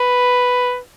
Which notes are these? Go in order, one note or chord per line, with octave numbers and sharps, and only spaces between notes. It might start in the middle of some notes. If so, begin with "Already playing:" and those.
Already playing: B4